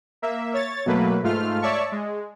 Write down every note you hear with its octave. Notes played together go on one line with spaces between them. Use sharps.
A#3 E5
C#5 A6
B2 F#3 A3 A#3 B4
G#2 A3 F4 F6
C#5 D5 E5 A5 C#6
G#3